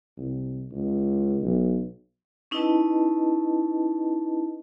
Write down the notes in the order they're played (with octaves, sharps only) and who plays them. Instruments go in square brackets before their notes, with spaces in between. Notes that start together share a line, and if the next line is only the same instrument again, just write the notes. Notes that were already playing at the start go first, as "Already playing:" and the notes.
[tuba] C2
C#2
B1
[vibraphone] C#4 D#4 E4 B4 D#5 A5